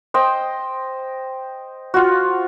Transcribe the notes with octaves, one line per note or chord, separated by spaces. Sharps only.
C5 D#5 G5
F4 F#4